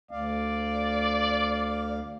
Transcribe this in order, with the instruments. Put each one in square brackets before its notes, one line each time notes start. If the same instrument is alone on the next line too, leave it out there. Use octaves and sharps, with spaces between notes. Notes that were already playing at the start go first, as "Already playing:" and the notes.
[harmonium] D2 F5 [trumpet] D5